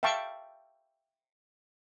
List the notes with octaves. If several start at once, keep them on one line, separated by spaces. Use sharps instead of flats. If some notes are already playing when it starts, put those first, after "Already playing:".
E5 F5 G5 A5 C#6